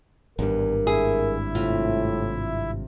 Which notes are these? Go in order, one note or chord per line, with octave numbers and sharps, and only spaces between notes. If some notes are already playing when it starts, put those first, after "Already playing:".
G#1 E2 G2 A#4
E4 G#4 E5
A2 C3 F4